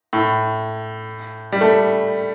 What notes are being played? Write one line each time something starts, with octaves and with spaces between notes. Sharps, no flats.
A2
G3
A3